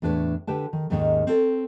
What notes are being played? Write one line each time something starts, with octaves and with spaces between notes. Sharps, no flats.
E2 A2 D4 B4 C#5
D3 G4 B4 G5 A5
D#3
D#2 G#2 D#3 G#3 C#4
C4 A4 C#5